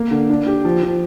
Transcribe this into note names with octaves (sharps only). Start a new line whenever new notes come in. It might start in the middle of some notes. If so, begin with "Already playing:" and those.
Already playing: A#3
D3
D4
G4
F3
F3